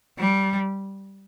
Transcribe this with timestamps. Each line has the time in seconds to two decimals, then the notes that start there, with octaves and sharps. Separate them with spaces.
0.18 G3